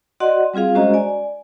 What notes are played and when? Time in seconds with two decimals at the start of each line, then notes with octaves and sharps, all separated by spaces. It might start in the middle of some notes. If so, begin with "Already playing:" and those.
0.20 F#4 D5 D#5 F#5 C6
0.54 G3 C4 F4 G#4 F5
0.75 G#3 C#4 F#4 C5 D#5 A#5
0.94 D5 G#5